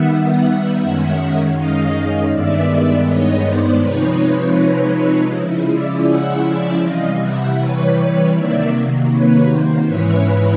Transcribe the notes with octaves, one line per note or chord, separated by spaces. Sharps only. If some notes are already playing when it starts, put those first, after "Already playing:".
Already playing: D#3 G3 B3 E5 F#5
F#2 D#3 G#3 C#4
D#5 F5
G2 D#3 G#3 B3 D5 E5
C#5 D#5
C5 D5
C3 F3 G#3 C4 D#4 B4 C#5
C#3 F3 G#3 C#4 E4
D5 E5
E5 F#5
D5 E5
C3 E3 G3 D#5 F5
E5 F#5
B4 C#5
C3 D#3 F#3 A#3 D5 E5
B4 C#5
C5
G#2 E3 G#3 C#4 E4 B4 C#5